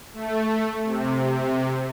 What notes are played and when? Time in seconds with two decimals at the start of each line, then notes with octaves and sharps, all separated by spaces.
0.14 A3
0.85 C3